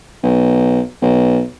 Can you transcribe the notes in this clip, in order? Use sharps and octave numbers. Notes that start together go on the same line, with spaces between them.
B1
B1